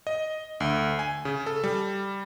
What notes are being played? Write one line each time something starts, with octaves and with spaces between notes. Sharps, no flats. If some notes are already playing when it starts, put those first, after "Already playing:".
D#5
D2
G#5
C#3
A4
G3